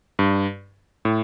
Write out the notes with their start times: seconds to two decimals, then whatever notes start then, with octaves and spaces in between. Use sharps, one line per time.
0.19 G2
1.05 A2